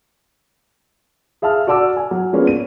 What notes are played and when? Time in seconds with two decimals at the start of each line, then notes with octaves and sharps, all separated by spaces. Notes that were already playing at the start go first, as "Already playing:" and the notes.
1.42 G#4 E5 F5 A5 F6
1.67 F#4 D5 A5 D6 E6
1.97 G#5
2.11 F#3
2.33 F3 G#3 A#3 B3 C#4 D4
2.47 D#7